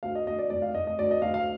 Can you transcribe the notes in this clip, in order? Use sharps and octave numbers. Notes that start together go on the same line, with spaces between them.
D2 F5
D#5
D2 D#5
D5
F1 D5
F5
F1 D#5
D#5
D2 D5
D#5
D2 F5
F5